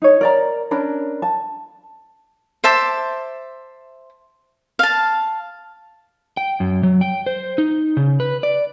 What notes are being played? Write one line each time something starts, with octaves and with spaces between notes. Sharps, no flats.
D#4 C#5
A#4 D5 A#5
C#4 D4 A#4 B5
A5
C5 E5 A5 D6
F5 A5
G5
F#2
F#3
G5
C5
D#4
C#3
B4
D5